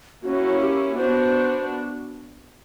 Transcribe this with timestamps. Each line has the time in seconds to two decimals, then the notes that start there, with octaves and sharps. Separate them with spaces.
0.23 A#3 C#4 E4 F#4
0.60 G4
0.97 B3 D4 F#4 C5